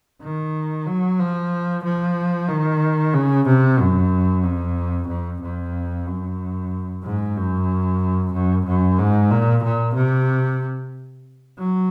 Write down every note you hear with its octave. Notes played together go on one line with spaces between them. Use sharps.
D#3
F#3
F3
F3
D#3
C#3
C3
F#2
F2
F2
F2
F#2
G#2
F#2
F#2
F#2
G#2
A#2
A#2
C3
F#3